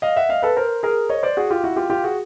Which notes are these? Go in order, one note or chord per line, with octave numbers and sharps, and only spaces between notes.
D#5 F5
E5 F#5
D#5 F5
A4 B4
A#4 C5
G#4 A#4
C#5 D#5
C5 D5
F#4 G#4
F4 G4
E4 F#4
F4 G4
F4 G4
F#4 G#4